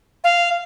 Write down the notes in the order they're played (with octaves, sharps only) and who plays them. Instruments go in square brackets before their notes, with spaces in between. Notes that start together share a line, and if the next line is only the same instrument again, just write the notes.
[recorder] F5